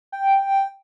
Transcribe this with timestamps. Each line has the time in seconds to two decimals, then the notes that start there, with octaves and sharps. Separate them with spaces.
0.12 G5